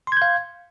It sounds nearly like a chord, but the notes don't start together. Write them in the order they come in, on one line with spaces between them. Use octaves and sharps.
C6 G#6 G6 F5